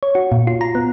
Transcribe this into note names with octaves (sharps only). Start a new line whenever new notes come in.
C#5
F#4
A#2
F4
A#5
B3